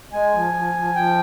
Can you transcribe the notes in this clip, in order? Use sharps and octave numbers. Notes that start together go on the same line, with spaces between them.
G#3 G#5
F3
F3
F3
F3 G5